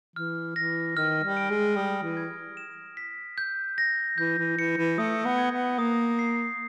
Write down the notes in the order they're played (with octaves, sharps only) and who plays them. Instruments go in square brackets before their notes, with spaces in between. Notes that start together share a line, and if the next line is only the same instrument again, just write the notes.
[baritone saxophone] E3 [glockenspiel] F6
[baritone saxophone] E3 [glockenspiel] A#6
[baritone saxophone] D#3 [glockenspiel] F6
[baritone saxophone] G3
[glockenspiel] D7
[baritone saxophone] G#3
[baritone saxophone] G3 [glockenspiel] D#6
[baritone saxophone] E3
[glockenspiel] G#6
E7
B6
G6
A#6
[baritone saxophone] E3 [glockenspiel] G6
[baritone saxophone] E3
[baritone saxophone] E3 [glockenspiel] C#7
[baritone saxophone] E3
[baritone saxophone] A3 [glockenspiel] D#6
[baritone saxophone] B3
[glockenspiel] G#6
[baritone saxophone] B3
[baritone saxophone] A#3 [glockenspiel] D#6
[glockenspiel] C7